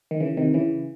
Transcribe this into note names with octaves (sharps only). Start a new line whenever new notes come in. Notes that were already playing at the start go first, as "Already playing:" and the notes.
D#3
C#3 E3
C3 D#3
C#3 E3